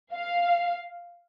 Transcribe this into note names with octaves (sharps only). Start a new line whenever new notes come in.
F5